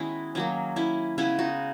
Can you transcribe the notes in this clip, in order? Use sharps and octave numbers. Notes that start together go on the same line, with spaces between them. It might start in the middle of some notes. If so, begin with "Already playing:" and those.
Already playing: D#3 G#3 B3 C#4 E4 F#4 G#4
D#3 F#3 A#3 C#4
C#4 E4
C#3 G#3 B3 C#4 E4
D#4 F#4